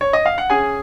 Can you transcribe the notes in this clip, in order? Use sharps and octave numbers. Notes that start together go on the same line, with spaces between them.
C#5
D#5
F5
F#5
C#4 G#4 G#5